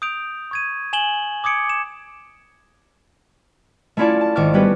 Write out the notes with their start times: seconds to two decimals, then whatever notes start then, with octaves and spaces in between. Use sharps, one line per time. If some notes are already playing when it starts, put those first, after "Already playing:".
0.02 D#6 G6 D7 F7
0.51 C#6 G#6 D#7
0.93 G#5 E7 F#7 G7
1.44 D6 D#6 G#6 C#7 D7
1.69 E7
3.97 A3 C#4 E4 F4 D5 A5
4.21 A5
4.36 G#1 A4 C#6 D6 F6
4.53 G3 B3 C#4 F#4 G4 B4